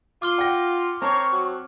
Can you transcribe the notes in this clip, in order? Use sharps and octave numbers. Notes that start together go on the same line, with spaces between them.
F4 D6 F6 G7
F#5 G5 A#6
C4 A#4 C5 C#5 A5 C#6
F#3